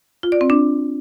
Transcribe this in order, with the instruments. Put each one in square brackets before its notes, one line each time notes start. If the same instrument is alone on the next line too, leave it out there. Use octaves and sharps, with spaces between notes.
[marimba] F4
D5
C4
D4